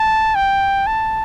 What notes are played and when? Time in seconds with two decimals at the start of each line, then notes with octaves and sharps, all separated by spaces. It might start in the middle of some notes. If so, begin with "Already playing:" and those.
Already playing: A5
0.35 G5
0.87 A5